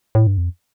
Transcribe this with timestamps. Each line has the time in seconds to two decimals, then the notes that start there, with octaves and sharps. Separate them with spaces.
0.15 A2
0.27 G2
0.38 F2